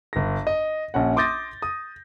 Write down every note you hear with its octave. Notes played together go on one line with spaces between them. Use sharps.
G1 A#6
D#5
A#1 C#4 F#5
C6 D6 D#6 G6 A6 A#6
D#6